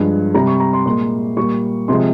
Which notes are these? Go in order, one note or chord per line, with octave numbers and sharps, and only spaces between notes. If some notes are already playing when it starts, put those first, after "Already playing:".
Already playing: G2 F3 G#3
C3 G3 A#5
C#6
A#5
C6
A#2 G#3 C6
A#2 G3 C#6
C3 F3 G#3 C6